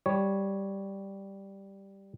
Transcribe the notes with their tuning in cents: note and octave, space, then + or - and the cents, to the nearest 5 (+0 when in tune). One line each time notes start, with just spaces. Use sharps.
G3 +0 C#5 +0